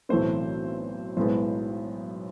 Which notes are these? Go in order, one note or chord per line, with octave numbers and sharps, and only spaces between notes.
B1 A2 E3 A3 C4 C5
B1 A2 G#3 B3 C5